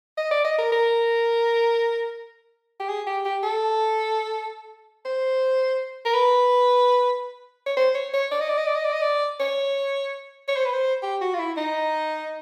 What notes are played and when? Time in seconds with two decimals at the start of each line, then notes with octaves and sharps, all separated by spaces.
0.17 D#5
0.31 D5
0.45 D#5
0.59 A#4
0.72 A#4
2.80 G4
2.89 G#4
3.07 G4
3.25 G4
3.43 A4
5.05 C5
6.05 A#4
6.14 B4
7.66 C#5
7.77 C5
7.95 C#5
8.14 C#5
8.31 D5
8.40 D#5
8.49 D5
8.57 D#5
8.66 D5
8.75 D#5
8.84 D5
8.92 D#5
9.01 D5
9.40 C#5
10.48 C#5
10.57 C5
10.65 B4
10.74 C5
11.03 G4
11.21 F#4
11.34 F4
11.39 E4
11.57 D#4